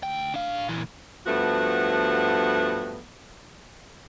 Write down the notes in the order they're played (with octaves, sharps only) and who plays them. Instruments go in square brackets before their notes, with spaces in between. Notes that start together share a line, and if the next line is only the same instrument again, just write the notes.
[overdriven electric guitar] D2 G5
D4 F5
A#2 E3
[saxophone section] G2 F3 A3 B3 F#4